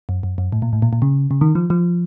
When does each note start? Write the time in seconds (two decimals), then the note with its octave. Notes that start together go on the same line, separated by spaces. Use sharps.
0.09 F#2
0.23 F#2
0.38 F#2
0.52 A2
0.62 A#2
0.73 A2
0.82 A#2
0.93 A#2
1.02 C#3
1.31 C#3
1.41 D#3
1.55 F3
1.70 F3